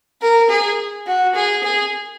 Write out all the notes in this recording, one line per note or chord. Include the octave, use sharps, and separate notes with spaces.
A#4
G#4
F#4
G#4
G#4